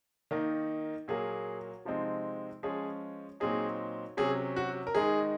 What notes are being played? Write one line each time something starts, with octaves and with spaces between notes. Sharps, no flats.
D#3 A#3 D#4
A#2 F#3 A#3 G#4
C3 F3 G#3 C4 D#4
F3 G#3 C#4 G#4
A#2 F#3 C4 D#4 G#4
C3 F#3 C#4 G#4
F#4
A#4
D#3 G#3 D#4 G#4